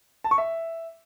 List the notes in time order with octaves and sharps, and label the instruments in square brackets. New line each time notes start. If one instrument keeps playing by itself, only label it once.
[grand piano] A5
C#6
E5